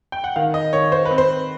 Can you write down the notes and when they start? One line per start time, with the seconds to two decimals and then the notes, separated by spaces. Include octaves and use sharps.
0.12 G5
0.24 F#5
0.36 D#3 F5
0.54 D#5
0.73 D#3 C#5
0.92 C5
1.05 B4
1.11 C4
1.18 C5